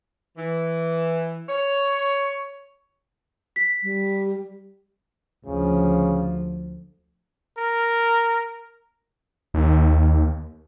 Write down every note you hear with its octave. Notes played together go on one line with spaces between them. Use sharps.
E3
C#5
B6
G3
D2 C#3 F3
A#4
D#2